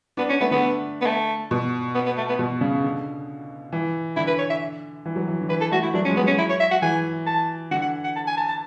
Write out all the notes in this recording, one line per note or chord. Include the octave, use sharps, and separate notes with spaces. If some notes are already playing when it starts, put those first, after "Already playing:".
B3 D4
C#4
A3 B3
D3 B3
B3
A3
B2
B3
B3
A3
B3
B2
C#3
D3
E3
D3 E4
B4
C#5
E5
E3
F#3
E3
D3
E3 B4
A4
A3 F#4
E4
F#3 D4
C#4
G#3
B3
F#3 C#4
E4
C#5
E5
F#5
E3 G#5
A5
D3 F#5
F#5
F#5
A5
G#5
A5
A5